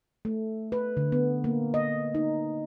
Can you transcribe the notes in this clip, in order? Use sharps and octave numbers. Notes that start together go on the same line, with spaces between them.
A3
B4
D3
B3
A#3
D#5
D#4